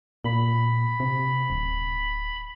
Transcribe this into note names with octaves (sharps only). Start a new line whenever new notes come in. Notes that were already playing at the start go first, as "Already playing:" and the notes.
A#2 B5
C3
D1